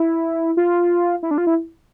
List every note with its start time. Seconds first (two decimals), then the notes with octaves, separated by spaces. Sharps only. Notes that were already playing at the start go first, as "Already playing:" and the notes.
Already playing: E4
0.57 F4
1.23 E4
1.31 D4
1.38 F4
1.47 E4